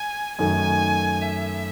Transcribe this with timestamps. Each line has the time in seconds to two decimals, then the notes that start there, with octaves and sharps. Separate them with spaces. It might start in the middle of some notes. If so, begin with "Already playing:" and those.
Already playing: G#5
0.38 F#2 D#3 A3 G#5
1.21 E5